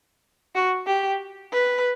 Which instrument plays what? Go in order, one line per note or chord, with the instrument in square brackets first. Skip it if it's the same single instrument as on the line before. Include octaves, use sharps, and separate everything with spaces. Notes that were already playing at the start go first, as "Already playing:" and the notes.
[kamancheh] F#4
G4
B4